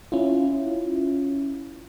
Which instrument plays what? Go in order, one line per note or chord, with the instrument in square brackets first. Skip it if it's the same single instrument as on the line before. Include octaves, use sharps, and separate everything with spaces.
[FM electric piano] C#4 E4 F4